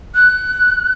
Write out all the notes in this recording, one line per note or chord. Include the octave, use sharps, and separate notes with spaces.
F#6